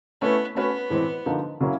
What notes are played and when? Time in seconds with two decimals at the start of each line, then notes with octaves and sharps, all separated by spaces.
0.21 A3 B3 C#4 E4
0.55 A3 B3 C#4 F#4 B4
0.90 A2 E3 G#3 C4
1.26 D3 F3 A#3 D#4
1.60 C#3 F#3 A#3 C#4 E4